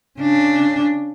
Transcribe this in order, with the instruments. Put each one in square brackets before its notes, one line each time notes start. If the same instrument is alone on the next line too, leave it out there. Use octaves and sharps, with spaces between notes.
[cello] C#3 D4